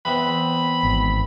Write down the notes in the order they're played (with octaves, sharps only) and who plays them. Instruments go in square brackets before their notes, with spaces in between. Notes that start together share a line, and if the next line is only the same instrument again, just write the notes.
[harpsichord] E2 C4 [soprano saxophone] B5
[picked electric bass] G#1